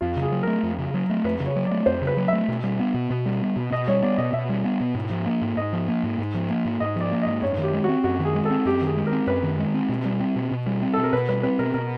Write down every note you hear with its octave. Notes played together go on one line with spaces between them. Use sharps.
F2 F4
C#3
G#4
F#3
A3 A#4
F2
C#3
F#3
A3
F2 B4
C#3
C#5
F#3
D5
A3
F2 C5
C#3
B4
F#3
A3 E5
B2
G3
B3
B2
B2
G3
B3
B2
B2 D#5
G3 C#5
B3 D5
B2 D#5
B2 E5
G3
B3
B2
G#2
F3
A#3
G#2
G#2 D#5
F3
A#3
G#2
G#2
F3
A#3
G#2
G#2 D#5
F3 D5
A#3
G#2 D#5
F#2 C#5
D#3
G4
G#3
C4 F#4
F#2 F#4
D#3
G#4
G#3
A4
C4
F#2 G4
D#3 G#4
G#3
A#4
C4
F#2 B4
D#3
G#3
C4
B2
G3
C4
B2
B2
G3
C4
B2 A4
A#4
B2 B4
G3 B4
C4 B4
B2 A#4
B2 A#4